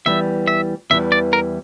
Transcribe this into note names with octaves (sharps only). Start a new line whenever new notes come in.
E2 E3 G3 E5
E5
E2 E3 G3 E5
D5
A#4